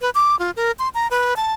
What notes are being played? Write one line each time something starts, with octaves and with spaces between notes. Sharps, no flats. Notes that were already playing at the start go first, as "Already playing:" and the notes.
B4
D6
F4
A#4
C6
A#5
B4
A5